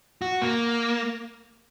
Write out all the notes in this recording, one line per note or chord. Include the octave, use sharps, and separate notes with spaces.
F#4
A#3